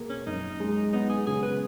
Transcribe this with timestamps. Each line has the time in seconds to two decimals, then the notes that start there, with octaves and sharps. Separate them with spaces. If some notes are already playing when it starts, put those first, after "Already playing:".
Already playing: B2 A#3 G#4
0.10 C#4
0.26 F#2 D#4
0.60 G#3
0.93 B3 D#4
1.10 G#4
1.27 C#3 G#4
1.43 B4